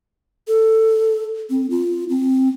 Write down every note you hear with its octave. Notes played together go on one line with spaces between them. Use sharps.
A4
C4
F4
C4